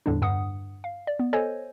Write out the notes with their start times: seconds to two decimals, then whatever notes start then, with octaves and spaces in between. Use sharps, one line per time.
0.06 E2 A2 D3 G3 D4
0.22 G2 F#5 D#6
0.84 F5
1.07 D5
1.19 B3
1.33 A4 C5 C#5 D#5 G#5